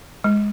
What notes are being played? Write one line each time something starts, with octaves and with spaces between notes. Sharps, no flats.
G#3